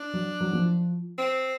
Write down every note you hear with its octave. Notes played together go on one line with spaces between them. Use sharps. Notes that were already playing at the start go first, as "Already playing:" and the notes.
Already playing: D4
F#3
F#3
F3
C4